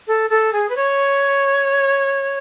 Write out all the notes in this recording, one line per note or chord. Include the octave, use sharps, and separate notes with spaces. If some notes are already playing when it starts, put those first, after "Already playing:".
A4
A4
G#4
B4
C#5